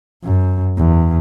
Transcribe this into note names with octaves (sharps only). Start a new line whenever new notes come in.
F#2
E2